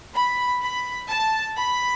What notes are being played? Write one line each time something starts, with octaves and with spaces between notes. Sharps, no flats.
B5
B5
A5
B5